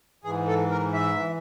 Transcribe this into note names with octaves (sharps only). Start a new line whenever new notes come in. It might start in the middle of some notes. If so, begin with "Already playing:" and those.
G#2 E3 G#4
A4
A#4
E5
E3